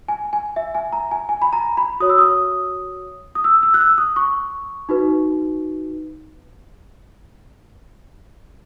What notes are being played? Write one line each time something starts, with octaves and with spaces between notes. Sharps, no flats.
G#5
G#5
E5
G#5
A#5
G#5
G#5
B5
A#5
B5
F#4 C#5 D#6
E6
D#6
D#6
E6
E6
F#6
E6
D#6
C#6
D#4 F#4 B4